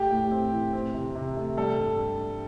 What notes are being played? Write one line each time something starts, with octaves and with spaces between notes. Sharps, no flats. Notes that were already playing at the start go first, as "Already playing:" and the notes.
Already playing: A3 G4
A2
C4
E3
C4
C3
C3
A3
G3 A4
G2